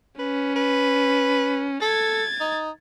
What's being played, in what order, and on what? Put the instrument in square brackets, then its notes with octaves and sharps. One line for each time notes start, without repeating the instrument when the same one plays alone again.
[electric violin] C#4 [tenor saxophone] B4
[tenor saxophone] B4
[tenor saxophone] A4 [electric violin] G#6 A6
[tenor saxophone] D#4